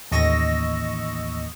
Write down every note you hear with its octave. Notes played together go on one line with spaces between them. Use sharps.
A1 D#2 D#5 C#6 E6 A#6